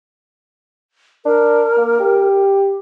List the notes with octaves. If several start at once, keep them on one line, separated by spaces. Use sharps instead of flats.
D4 A#4
A#3
G4